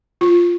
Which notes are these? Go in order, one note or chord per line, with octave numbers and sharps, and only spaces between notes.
F4